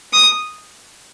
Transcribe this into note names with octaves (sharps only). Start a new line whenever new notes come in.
D#6